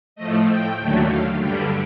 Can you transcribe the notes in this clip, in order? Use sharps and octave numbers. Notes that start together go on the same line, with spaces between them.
A2 F3 A3 D#5
G5
D#2 D3 F#3 A3
F5
G2 D3 G3 G5